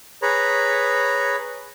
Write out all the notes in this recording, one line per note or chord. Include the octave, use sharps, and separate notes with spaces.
G#4 B4 C#5 A#5 B5